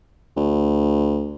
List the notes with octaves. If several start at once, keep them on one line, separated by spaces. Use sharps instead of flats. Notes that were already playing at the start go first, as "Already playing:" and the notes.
D2